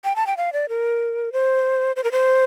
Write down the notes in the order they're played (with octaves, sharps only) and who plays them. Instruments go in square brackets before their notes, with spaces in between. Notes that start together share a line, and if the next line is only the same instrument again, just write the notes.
[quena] G5
A5
G5
F5
D5
A#4
C5
C5
A#4
C5